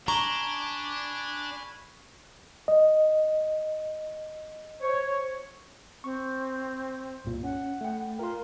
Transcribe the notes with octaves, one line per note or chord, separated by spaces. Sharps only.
D4 G#5 A#5 B5 C#6 F6 G7
D#5
C5 C#5
C4 C#6
C2 G2 A#2
C#4 F#5
A3 G5
F4 A#4 C6